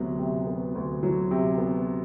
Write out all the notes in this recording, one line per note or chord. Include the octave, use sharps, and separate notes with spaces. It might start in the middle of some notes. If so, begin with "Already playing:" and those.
Already playing: D2 C3 F#3 B3
C3
B3
D2
F#3
C3
B3